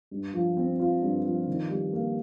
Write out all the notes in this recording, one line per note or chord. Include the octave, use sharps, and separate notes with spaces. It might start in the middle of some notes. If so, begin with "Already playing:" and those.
G2
F3
C4
F4
G2
F3
D#3
G3
A#3